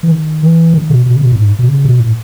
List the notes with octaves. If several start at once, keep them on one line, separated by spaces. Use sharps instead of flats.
E3
D#3
E3
D#3
B2
B2
C#3
B2
A2
G#2
B2
C#3
B2
A2